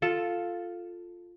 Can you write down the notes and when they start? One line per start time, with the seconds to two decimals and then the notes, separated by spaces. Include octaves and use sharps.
0.02 F4 A4